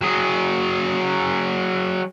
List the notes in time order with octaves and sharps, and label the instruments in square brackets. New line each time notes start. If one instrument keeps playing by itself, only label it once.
[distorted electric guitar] F#3 G#4